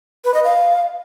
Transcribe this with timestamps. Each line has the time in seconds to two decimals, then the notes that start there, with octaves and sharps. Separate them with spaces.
0.24 B4
0.34 D#5
0.44 F5